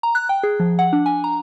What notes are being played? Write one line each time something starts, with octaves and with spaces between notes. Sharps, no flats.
A#5
F#6
G5
G#4
F3
F#5
D4
G#5
A#5